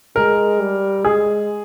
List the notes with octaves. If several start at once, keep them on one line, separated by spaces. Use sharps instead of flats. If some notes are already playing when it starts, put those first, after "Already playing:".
G#3 A#4
G3
G#3 G#4